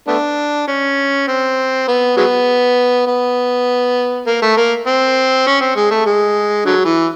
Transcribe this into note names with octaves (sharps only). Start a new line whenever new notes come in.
A3 B3 D4
C#4
C4
B3
F#3 G#3 B3
B3
A#3
A3
A#3
C4
C#4
C4
G#3
A3
G#3
D3 F#3
E3